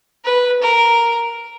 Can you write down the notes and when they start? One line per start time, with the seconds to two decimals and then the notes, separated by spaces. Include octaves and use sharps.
0.24 B4
0.62 A#4